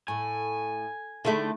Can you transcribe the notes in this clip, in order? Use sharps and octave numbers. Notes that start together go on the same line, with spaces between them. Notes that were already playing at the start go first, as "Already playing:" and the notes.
A2 G#5
D3 D#3 A3 E4 G#4